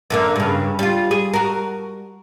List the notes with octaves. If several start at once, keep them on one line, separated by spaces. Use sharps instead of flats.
F#2 D3 A#3
G2 C#3
G3 F4
G#4
F#4 A#4